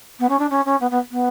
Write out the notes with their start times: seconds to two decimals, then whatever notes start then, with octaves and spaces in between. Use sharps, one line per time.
0.19 B3
0.29 C#4
0.39 D4
0.50 C#4
0.65 C#4
0.81 B3
0.91 B3
1.11 B3